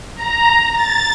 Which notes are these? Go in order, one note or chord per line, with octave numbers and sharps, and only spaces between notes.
A#5
A6